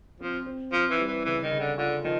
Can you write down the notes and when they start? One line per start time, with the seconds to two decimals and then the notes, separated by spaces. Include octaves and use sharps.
0.20 F3 C4
0.46 C4
0.72 F3 C4
0.90 E3
1.00 G3
1.08 E3
1.25 C#3 E3
1.43 D#3
1.52 C#3
1.60 D3
1.78 D3 F4
2.04 D#3 F3